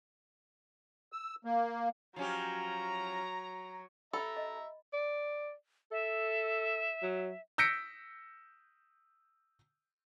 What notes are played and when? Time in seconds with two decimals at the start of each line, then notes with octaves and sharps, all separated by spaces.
1.12 E6
1.45 A#3
2.16 F3 F#3 C#4 G4 A#5
4.13 A4 E5 A#5 B5
4.37 D#5
4.93 D5
5.92 A4 E5
7.03 F#3
7.58 E6 G6 A#6 B6 C#7 D7